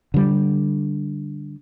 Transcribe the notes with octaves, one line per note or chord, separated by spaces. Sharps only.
D3 G3